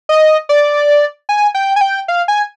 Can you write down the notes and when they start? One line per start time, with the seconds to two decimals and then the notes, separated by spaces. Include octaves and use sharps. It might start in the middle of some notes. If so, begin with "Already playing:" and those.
0.09 D#5
0.49 D5
1.29 G#5
1.54 G5
1.76 G#5
1.81 G5
2.08 F5
2.28 G#5